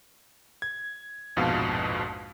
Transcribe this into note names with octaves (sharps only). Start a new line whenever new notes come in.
G#6
A#1 F2 G#2 B2 F5 A5